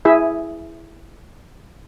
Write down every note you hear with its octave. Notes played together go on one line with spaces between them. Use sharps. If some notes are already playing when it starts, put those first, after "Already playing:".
E4 G#4 E5